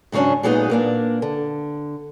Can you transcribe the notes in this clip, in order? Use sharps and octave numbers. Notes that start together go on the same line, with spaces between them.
G#2 C#3 F#3 C#4 D4
A#2 F#3 G#3 B3 D#4 G#4
A#2 A#3 D4
D3